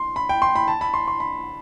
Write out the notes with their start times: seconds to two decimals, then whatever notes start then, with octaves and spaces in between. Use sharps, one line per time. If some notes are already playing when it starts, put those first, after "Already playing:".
Already playing: C6
0.16 B5
0.29 G5
0.42 C6
0.56 B5
0.68 A5
0.81 B5
0.94 C6
1.08 C6
1.20 B5